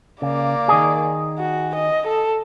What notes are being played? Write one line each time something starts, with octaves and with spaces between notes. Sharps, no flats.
C#3 A#3 D5
D#3 G#4
F#4
D#5
A4